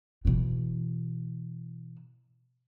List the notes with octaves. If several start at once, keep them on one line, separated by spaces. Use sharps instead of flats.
B2 E3